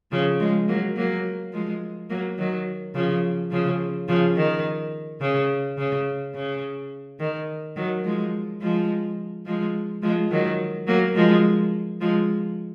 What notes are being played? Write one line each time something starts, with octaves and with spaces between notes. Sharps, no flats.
C#3 F3
F3 G#3
F#3 A#3
F#3 A#3
F3 G#3
F#3 A#3
D#3 F#3
C#3 F3
C#3 F3
C#3 F3
D#3
C#3
C#3
C#3
D#3
D#3 F#3
F3 G#3
F3 G#3
F3 G#3
F3 G#3
D#3 F#3
F#3 A#3
F3 G#3
F3 G#3